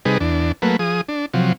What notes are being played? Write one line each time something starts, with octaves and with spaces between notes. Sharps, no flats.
C3 G3 D#4 G#4 B4
E2 D4
F#3 A3 A#3 B4
F3 G#4 D#6
D4
C3 F3 F#3